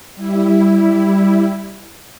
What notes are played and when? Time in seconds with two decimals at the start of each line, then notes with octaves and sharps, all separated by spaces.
0.15 G3 E4